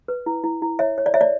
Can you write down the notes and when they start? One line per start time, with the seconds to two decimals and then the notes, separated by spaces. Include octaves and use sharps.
0.08 B4
0.26 E4
0.44 E4
0.62 E4
0.79 C#5 E5
0.98 C#5
1.06 D5
1.14 C#5 E5
1.21 D5